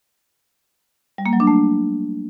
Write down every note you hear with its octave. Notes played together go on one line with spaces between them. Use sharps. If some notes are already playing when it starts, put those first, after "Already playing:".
G3
A#3
F#3
D4
A3